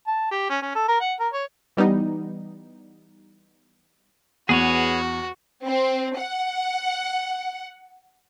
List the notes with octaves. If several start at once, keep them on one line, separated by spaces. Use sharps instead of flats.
A5
G4
C#4
C#4
A4
A#4
F#5
A#4
C#5
E3 G3 B3 D#4
E2 F#4 G#4 B4 C#5 D#7
C4
F#5